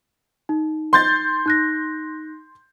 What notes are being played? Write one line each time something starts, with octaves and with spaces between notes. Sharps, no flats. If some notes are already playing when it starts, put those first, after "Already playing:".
D#4
C6 G6 A6
D#4 F#6 A#6